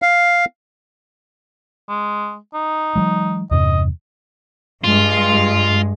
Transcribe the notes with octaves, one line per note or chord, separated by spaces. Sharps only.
F5
G#3
D#4
E3 F#3 G#3
E2 G2 C3 D#5
G2 G#3 F4